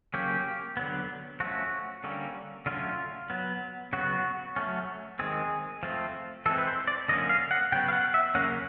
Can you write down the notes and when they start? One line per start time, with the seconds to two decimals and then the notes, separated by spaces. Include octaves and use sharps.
0.14 C#3 F#3 A#3 C#4 G4
0.77 D3 F#3 B3
1.40 F3 A3 C#4 F#4
2.04 D3 G3 A#3 C#4
2.66 D3 F#3 A3 C#4 F4
3.30 F#3 B3
3.93 C#3 F#3 B3 F#4
4.56 F#3 A3 C#4
5.19 D#3 G#3 C4 G#4
5.83 F3 A3 C4
6.46 E3 G#3 C4 A4
6.58 B4
6.67 C5
6.87 D5
7.08 D3 F#3 A#3 C#4 D#5
7.29 F5
7.51 F#5
7.72 C#3 F#3 B3 G5
7.88 F5
7.93 F#5
8.14 E5
8.35 C#3 F#3 A#3 C#4 F#5